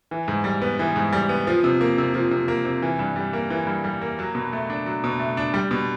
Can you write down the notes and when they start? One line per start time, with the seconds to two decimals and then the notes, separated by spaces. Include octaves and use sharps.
0.11 E3
0.28 G#2
0.44 G3
0.62 B3
0.79 E3
0.96 G#2
1.13 G3
1.29 B3
1.47 F3
1.64 C3
1.81 A#3
1.98 C3
2.14 F3
2.31 C3
2.48 A#3
2.65 C3
2.82 E3
2.99 G2
3.16 G3
3.33 A#3
3.50 E3
3.67 G2
3.84 G3
4.01 A#3
4.19 F#3
4.35 B2
4.53 A3
4.70 D4
4.86 F#3
5.04 B2
5.20 A3
5.37 D4
5.54 G3
5.71 B2